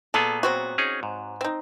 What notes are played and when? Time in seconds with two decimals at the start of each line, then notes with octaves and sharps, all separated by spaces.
0.14 A#2 B3 G#4 A4
0.43 F#3 C4 F#4
0.78 C#4 D#4 G#4
1.03 G#2
1.41 C4 D#4